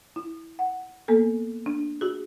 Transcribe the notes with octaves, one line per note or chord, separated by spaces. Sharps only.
E4
F#5
A#3 B3 A4
D4
F#4 G#4